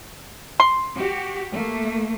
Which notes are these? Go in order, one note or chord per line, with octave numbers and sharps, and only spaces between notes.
C6
F#4 G4
A3 A#3